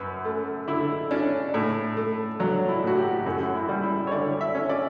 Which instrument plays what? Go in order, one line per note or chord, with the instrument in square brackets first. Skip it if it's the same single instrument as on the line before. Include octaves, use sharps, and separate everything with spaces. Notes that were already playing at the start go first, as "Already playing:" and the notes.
Already playing: [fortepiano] F#2 B4
A3
D3 E4
C#4 D4
A2
A3
F#3 D4
E4
A2 F#4
G4
F#2 F#4
E4
G3
E4
C#5
D3 D5
E5
C#4
D5